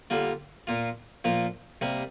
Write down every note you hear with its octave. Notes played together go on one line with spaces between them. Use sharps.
D3 G3 A#3 F4
A#2 A#3 F4
A#2 F3 A#3 F4
C3 G3 A#3